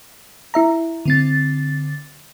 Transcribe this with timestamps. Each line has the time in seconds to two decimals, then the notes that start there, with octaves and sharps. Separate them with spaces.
0.54 E4 E5 A#5
1.05 D3 C4 A6